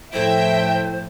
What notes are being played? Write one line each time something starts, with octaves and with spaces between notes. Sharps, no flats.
A2 F3 E4 A4 C5 E5 G5